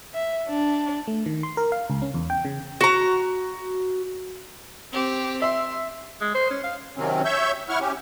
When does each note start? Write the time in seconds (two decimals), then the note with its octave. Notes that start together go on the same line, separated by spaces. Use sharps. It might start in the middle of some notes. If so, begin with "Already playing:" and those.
0.14 E5
0.48 D4
1.08 A3
1.26 D#3
1.43 C6
1.57 A#4
1.72 F5
1.90 C#2
2.02 C#4
2.14 E2
2.30 G5
2.45 C#3
2.81 F#4 A#5
4.92 C4 G4
5.42 E5 C6
6.21 G#3
6.35 C5
6.50 C#4
6.64 F5
6.97 C3 D#3 F#3 C4 C#4
7.25 C#5 E5 C#6 E6 G6
7.69 E4 F#5 C#6 F6
7.80 C#4 G4